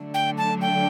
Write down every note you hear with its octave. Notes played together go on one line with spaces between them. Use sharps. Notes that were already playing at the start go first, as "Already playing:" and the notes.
Already playing: D3 F#3 A3 D4
G5
A5
G5